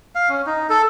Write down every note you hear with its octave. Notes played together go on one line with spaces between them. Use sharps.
F5
C#4
D#4
A4